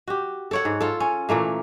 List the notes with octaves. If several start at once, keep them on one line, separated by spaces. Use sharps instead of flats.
F#4 G4
A4 C#5 F#5
G#2
F4 A4
C#4
A#2 E3 A3 A#3